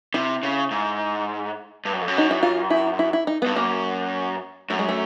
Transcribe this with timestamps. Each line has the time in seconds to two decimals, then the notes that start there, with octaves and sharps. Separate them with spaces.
0.14 C3 E4
0.43 C#3
0.71 G#2
1.85 G2
1.93 F#2
2.01 F2
2.08 F#2
2.18 D#4
2.31 E4
2.43 F4
2.70 E4
2.99 E4
3.13 E4
3.27 D#4
3.42 G2 B3
3.55 F#2 A#3
4.70 F#2 A3
4.79 G#3
4.89 A3